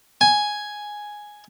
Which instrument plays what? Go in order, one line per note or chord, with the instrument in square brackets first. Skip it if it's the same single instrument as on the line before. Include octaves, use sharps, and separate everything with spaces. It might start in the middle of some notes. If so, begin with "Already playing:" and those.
[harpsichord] G#5